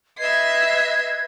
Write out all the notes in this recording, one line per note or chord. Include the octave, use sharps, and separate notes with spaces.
B4 D#5 E5 G#6 C7